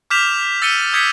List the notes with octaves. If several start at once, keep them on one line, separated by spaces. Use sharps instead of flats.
D6 F6 G6 B6 E7 F7
E6 A6 B6 C#7 D#7 G7
D#6 G6 G#6 B6 C#7